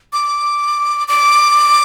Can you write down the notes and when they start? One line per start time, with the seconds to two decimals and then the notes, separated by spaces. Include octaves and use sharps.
0.13 D6
1.08 D6